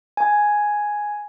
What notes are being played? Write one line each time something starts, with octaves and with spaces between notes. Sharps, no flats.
G#5